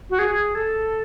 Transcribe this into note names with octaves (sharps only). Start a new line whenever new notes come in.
F#4
G#4
A4